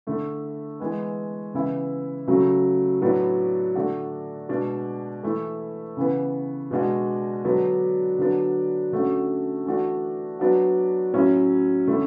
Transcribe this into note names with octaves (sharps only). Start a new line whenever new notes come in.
D3 A3 E4
E3 G#3 B3
C#3 E3 B3 E4
C#3 F#3 A3
A2 F#3 B3 D4 F#4
D3 A3 D4 F#4
B2 G#3 D4 F#4
E3 A3 E4
C#3 E3 B3
B2 G#3 D4 F#4
D3 F#3 B3 D4 F#4
D3 F#3 B3 D4
D3 A3 C#4 F#4
E3 A3 D4 F#4
F#3 B3 D4 F#4
A2 F#3 C#4 E4
D3 A3 C#4 E4